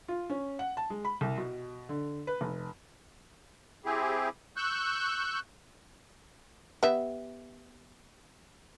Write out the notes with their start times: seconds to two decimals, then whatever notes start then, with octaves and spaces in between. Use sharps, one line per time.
0.08 F4
0.30 C#4
0.59 F#5
0.77 A5
0.90 G#3
1.05 B5
1.21 C2
1.38 B2
1.89 D3
2.27 B4
2.41 F1
3.85 C4 E4 G4 G#4
4.57 C#6 E6 F#6 G6
6.83 B3 G4 E5